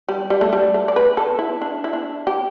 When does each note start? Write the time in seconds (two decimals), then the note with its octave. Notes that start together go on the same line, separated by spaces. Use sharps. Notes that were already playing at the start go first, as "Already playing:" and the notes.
0.08 G3
0.30 G3
0.41 A3
0.53 G3
0.74 A3
0.88 D5
0.96 B4
1.17 A4
1.39 E4
1.62 D4
1.84 E4
1.93 D4
2.27 G4